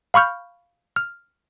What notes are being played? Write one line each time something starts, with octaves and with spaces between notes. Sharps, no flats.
F5 B5 C#6 F6 G6
F6